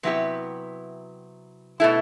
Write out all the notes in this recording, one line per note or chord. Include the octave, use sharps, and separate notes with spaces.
C3 F#3 B3 E4 G4
B2 A3 E4